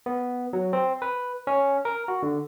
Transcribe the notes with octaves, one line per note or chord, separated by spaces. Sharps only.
B3
F#3
C4
B4
C#4
A#4
F#4
D3